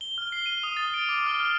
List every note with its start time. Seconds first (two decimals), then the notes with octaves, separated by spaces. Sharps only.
0.01 G7
0.18 F6
0.32 C7
0.46 D#7
0.63 D#6
0.77 A6
0.94 D7
1.09 D6
1.27 F6
1.40 F6